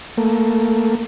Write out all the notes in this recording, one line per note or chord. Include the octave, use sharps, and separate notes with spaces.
A3 A#3